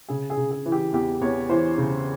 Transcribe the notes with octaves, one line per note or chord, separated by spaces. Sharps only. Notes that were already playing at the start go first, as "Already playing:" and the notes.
C#3 G#4
G#4
C#3
G#4
E3
G4
E2 G4
E2 C#5
E3 C5
C#3